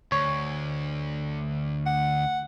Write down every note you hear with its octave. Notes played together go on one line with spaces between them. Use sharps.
D2 C#5
F#5